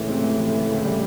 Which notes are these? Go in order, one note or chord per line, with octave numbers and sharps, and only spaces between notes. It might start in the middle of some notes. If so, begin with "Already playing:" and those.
Already playing: C#2 A2 E3
C3
E3
E3
E3
C#2
G3